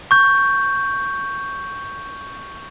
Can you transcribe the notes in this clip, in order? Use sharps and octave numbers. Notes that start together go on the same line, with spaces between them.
C#6 G6